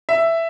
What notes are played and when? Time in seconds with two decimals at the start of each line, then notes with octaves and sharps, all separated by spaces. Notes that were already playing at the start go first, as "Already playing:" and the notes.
0.09 E5